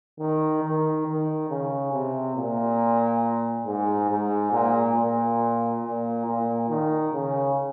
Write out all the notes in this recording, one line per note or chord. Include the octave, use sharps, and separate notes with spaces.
D#3
D#3
D#3
C#3
C3
A#2
G#2
G#2
A#2
A#2
A#2
A#2
D#3
C#3